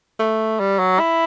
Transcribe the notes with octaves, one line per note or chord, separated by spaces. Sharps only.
A3
G3
F#3
E4